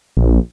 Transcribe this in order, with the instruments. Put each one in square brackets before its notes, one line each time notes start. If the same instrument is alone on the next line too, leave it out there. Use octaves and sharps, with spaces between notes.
[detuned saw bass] A#1